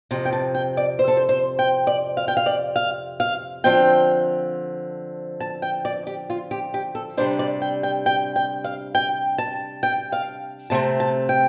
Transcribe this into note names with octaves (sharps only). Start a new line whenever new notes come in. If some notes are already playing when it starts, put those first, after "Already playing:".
F2 C3
G5
A5
G5
D5
C5
A4
C5
C5
G5
D5
F5
G5
F5
D5
F5
F5
D3 F3 C4 G5
A5
G5
D5
G4
F4
G4
G4
A4
C3 G3 D4 C5
D5
G5
G5
G5
G5
F5
G5
A5
G5
F5
C3 A3 C4 A5
A5
G5